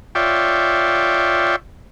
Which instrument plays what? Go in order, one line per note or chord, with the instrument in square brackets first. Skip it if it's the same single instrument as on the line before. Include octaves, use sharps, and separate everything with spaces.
[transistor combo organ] F4 C#5 D5 E5 G5